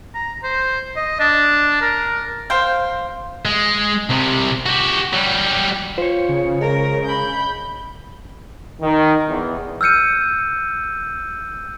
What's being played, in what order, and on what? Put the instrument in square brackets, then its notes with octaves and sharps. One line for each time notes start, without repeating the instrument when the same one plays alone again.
[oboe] A#5
C5
D#5
D4
A#4
[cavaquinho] C5 F5 G5
[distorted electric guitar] G#3
C2 C3
F#4 G4
F#3 G3
[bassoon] F4 [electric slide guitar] C5 C#5
[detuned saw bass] C#3
[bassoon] G#3 [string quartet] A#4
[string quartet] B5 G6
[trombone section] D#3
E2
[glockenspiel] E6 F6 G6 C#7 D#7